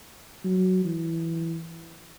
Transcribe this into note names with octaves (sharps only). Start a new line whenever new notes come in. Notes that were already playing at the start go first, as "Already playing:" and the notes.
F#3
E3